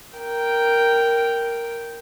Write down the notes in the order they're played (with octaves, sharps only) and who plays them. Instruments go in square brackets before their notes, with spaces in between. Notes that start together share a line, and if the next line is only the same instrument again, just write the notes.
[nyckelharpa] A#4 G5